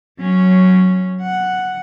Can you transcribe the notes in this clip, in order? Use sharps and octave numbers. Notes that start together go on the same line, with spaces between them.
F#3 C#4
F#5